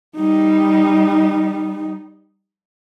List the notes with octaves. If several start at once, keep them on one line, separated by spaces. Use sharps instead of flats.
G3 D#4